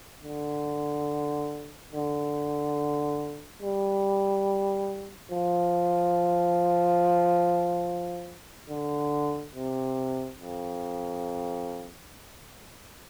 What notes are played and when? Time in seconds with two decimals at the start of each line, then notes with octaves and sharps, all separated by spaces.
0.23 D3
1.93 D3
3.62 G3
5.31 F3
8.70 D3
9.55 C3
10.39 F2